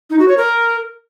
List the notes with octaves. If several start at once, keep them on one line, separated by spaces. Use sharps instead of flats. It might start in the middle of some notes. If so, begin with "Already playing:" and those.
D#4
F#4
C#5
A#4